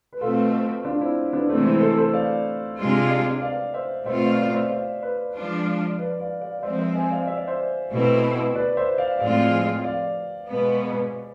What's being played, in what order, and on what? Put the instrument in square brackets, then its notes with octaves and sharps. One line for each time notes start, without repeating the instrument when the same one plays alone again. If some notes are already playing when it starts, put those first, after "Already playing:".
[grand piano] B4
[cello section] B2 A3 C4 [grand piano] F4 A4
[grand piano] D4 F4
C4 E4
B3 D4
[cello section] C3 E3 G#3 [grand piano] A3 C4
[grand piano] C4 E4
A4 C5
A4 C5
D5 F5
[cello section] C3 G#3 D4 F4
[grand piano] D5 F5
C5 E5
[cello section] B2 A3 C4 F4 [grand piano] C5 E5
[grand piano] D5 F5
D5 F5
C5 E5
D5 F5
B4 D5
[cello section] F3 G#3 D4 F4
[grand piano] B4 D5
D5 F5
D5 F5
D5
[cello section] F3 G#3 C4 [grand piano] C5 E5
[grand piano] C5 E5
E5 G#5
D5 F5
E5
D5
C5 E5
[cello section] B2 A3 C4 E4
[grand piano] B4 D5
C5 E5
D5 F5
[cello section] A2 F3 G#3 C4 F4 [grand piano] D5 F5
[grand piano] D5 F5
[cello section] B2 G#3 B3